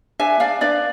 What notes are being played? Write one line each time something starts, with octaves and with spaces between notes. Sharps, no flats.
D4 E5 G#5
D4 D5 F5
D4 B4 D5